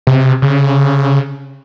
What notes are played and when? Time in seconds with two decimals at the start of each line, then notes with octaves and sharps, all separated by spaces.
0.07 C3
0.42 C#3